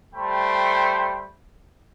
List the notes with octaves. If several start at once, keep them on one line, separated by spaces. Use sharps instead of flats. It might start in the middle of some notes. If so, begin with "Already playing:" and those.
G3 A3 C5 G5 B5